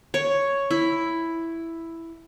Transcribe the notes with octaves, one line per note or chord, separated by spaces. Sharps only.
C#5
E4